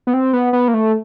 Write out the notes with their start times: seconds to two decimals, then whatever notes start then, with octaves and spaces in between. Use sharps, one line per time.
0.07 B3
0.14 C4
0.33 B3
0.53 B3
0.68 A#3
0.74 A3